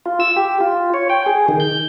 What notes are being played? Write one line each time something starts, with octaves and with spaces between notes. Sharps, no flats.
F4
E6
G4
F4
C#5
G5
G#4
D#3
G6